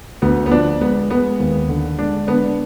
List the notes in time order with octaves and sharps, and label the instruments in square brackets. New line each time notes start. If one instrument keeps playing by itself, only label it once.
[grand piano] D2 [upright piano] B3
[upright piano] B3
[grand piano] F3 [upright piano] D4
[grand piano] G#3 [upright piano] B3
[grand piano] G#3 [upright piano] B3
[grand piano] D#2
D3
[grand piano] G#3 [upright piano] D4
[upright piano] B3 [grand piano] D4